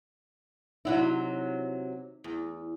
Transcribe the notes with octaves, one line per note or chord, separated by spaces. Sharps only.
C3 F#3 D#4 E4
E2